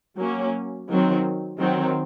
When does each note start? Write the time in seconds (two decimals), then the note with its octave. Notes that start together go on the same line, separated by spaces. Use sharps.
0.19 F#3 A#3 C#4
0.90 D#3 F#3 C4
1.59 D#3 F#3 C4